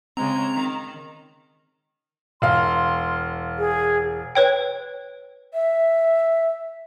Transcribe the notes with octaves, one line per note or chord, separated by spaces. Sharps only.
C#3 G#3 C4 A#5
D#3
E1 F5 C6
G#4
B4 C#5 G5
E5